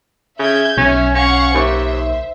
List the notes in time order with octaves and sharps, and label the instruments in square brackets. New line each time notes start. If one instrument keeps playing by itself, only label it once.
[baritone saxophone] C#3 [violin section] E5 G6 G#6
[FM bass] B1 [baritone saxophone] C#4 [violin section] C#5 E5
[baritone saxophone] C#4 [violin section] F5 F#5 C#6
[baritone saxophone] D#2 [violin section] C5 E5